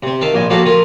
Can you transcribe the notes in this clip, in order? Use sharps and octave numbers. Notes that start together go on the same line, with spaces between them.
C3 C4
D#3 E5 F5 A5
A#1 A#2 G#5
F3 A#3 F#4 G4 A4 F5
F4 G#4 A#4